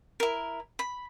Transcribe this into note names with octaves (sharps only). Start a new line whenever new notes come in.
E4 A#4
B5